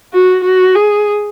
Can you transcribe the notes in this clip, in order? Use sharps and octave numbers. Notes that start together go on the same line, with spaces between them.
F#4
F#4
G#4